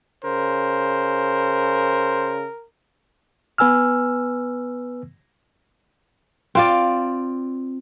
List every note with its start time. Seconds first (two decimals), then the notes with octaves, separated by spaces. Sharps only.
0.25 C#3 A#4 C5
3.58 B3 B4 G#5 E6 F6
6.55 C4 F4 D5